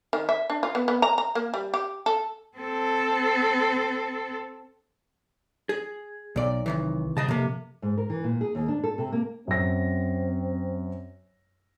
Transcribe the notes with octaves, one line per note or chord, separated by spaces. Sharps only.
D#3
E5
D4
F4
B3
B3
A#5
A#5
A#3
G3
G4
A4
C4 A4
G#4
B1 B2 D5
C3 D#3 E3
C2 C#3 D#5 A5
F2 C3 A#3
G#2
A#4
E3
A#2
G#4
D#2
D4
A4
C3
A#3
F#2 C4 A#6